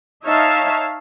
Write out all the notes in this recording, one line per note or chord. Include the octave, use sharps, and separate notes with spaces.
D#4 C#5 E5 F5 A5